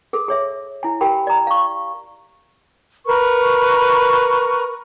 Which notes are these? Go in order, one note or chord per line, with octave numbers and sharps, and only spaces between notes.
G#4 A4
G#4 C#5 E5
E4 G#5
G4 A#4 G5 B5
D5 A#5
F5 C#6
A#4 B4 C#6